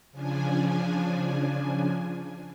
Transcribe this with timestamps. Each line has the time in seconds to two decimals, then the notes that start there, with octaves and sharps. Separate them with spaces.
0.12 C#3 F3 D4 G#5